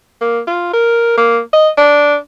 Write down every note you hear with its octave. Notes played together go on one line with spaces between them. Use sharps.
A#3
F4
A#4
A#3
D#5
D4